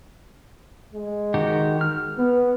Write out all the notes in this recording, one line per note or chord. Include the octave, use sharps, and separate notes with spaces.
G#3
D#3 F#4 G4
F6
B3